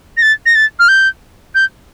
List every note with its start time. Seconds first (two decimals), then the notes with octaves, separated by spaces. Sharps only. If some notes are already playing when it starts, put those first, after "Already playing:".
0.17 A#6
0.22 A6
0.46 A#6
0.55 A6
0.79 F6
0.88 G6
1.55 G6